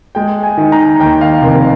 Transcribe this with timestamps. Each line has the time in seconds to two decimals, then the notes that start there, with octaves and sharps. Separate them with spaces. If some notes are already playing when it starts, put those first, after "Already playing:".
0.15 G#3 G5
0.43 G#5
0.58 D#3
0.72 A#5
1.00 D#2 G5
1.21 F5
1.42 F1 A#4